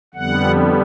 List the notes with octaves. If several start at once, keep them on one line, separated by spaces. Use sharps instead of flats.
F2 D3 G3 B3 F#5